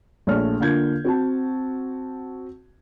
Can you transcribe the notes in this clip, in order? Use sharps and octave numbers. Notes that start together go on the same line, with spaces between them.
A#1 A3 C#5 D5 F6
D3 A#3 F4 G6 G#6
C4 F#4 A5